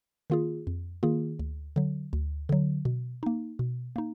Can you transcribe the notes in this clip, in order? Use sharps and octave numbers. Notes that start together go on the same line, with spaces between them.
D#3 A#3 F4 G#4
F2
D#3 A#3 F4 G#4
D2
D3 F#3
D2
D3 F#3
B2
A#3 D#4
B2
A#3 D#4